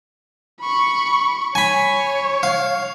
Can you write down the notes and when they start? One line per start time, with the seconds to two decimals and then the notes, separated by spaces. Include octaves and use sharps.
0.61 B5 C#6
1.55 C#5 G#5 B5
2.43 F5